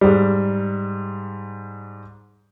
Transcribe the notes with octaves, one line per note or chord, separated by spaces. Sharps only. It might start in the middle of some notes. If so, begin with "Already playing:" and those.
G#2 G3